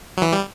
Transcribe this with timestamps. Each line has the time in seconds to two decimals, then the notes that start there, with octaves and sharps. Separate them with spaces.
0.17 F#3
0.22 E3
0.33 G3